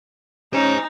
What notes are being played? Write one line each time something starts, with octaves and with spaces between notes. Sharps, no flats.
C#4 D#4 C5 G#5